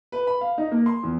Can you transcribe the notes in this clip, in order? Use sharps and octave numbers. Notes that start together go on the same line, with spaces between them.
B4
B5
F5
D#4
A#3
C6
E2